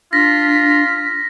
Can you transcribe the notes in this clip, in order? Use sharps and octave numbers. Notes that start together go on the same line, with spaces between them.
D4 F4 A#6 B6